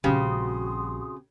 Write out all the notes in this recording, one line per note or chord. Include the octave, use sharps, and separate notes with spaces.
A#1 C#3 G3 C4 F#4 G4 C6 D#6